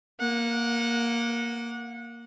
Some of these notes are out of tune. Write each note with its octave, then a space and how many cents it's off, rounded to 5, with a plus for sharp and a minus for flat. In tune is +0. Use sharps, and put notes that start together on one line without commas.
A#3 +0 F#5 -25